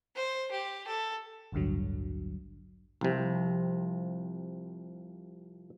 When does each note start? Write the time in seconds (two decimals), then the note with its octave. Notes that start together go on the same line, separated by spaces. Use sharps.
0.15 C5
0.51 G4
0.87 A4
1.52 A1 D2 G2 D3 F#3
3.01 C2 C3 F3